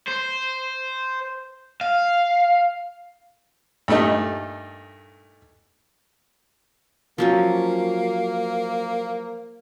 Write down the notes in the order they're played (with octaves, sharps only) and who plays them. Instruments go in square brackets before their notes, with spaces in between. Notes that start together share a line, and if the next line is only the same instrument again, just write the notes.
[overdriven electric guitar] C5
F5
[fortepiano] G2 A#2 A3 D#4
[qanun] F3 F#3 C#4 [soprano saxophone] A#3